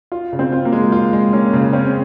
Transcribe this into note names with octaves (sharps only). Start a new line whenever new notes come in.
F4
C#3
C4
F4
A#3
G#3
F4
G#3
A#3 C#4
C#3
C4 C#4